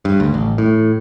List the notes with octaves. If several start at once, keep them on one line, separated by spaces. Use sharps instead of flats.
G2
D2
A1
A2